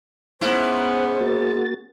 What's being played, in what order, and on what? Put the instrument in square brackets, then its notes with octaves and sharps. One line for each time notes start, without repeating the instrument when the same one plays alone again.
[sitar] G#2 E4 [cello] B3 C#4 [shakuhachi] C5 [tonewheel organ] F#6
[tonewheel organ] A#3 F#4 A6